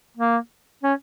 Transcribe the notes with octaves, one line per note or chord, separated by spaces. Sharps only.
A#3
C#4